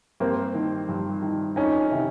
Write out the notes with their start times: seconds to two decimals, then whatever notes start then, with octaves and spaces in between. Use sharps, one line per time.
0.20 G2 A#3 C4
0.54 D#3
0.89 G2
1.22 D#3
1.56 F2 C#4 D#4
1.91 C3 D#3